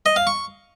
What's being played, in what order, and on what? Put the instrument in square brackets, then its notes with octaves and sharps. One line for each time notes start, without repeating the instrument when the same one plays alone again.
[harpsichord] D#5
F5
C#6